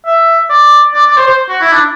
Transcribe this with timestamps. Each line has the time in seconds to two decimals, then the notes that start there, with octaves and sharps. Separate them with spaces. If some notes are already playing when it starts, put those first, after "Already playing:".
0.06 E5
0.50 D5
0.94 D5
1.06 D5
1.17 C5
1.27 C5
1.49 F#4
1.61 E4
1.72 D4